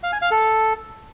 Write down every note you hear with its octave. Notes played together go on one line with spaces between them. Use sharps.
F5
G#5
F5
A4